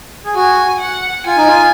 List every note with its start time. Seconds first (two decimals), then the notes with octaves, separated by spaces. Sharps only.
0.25 G#4
0.35 F#4 G#5
0.80 F#5
1.26 F4 G#5
1.37 D#4
1.47 F4